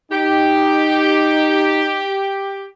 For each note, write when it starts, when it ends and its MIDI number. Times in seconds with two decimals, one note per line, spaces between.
0.12 2.04 63
0.12 2.66 67